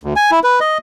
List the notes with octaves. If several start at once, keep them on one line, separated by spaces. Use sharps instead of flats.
D2
G#5
E4
B4
D#5